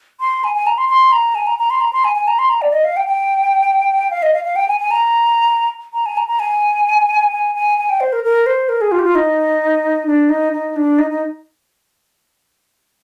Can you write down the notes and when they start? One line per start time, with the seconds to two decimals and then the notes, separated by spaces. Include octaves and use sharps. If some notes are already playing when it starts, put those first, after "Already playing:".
0.20 C6
0.44 G#5
0.55 G#5
0.67 A#5
0.78 C6
0.89 C6
1.12 A#5
1.35 G#5
1.47 A#5
1.59 A#5
1.70 C6
1.81 A#5
1.93 C6
2.04 G#5
2.15 G#5
2.28 A#5
2.39 C6
2.50 A#5
2.62 D5
2.72 D#5
2.84 F5
2.97 G5
3.07 G5
4.11 F5
4.23 D#5
4.34 F5
4.44 F5
4.56 G5
4.68 G#5
4.79 G#5
4.91 A#5
5.94 A#5
6.06 G#5
6.17 A#5
6.28 A#5
6.40 G#5
7.32 G#5
7.55 G#5
7.78 G#5
7.89 G5
8.00 C5
8.13 A#4
8.24 A#4
8.46 C5
8.69 A#4
8.81 G#4
8.92 F4
8.99 G4
9.03 F4
9.15 D#4
10.07 D4
10.29 D#4
10.53 D#4
10.76 D4
10.99 D#4
11.10 D#4